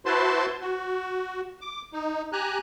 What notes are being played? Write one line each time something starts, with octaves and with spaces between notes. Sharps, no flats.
E4 F#4 B4 C5 A5 C6
F#4
D6
D#4
G4 G#5 A#5 F#6